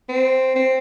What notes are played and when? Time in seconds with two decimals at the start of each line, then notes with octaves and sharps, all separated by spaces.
0.09 C4
0.56 C4